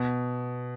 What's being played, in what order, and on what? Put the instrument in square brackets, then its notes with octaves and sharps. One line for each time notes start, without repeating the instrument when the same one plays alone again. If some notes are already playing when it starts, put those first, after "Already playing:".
Already playing: [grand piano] B2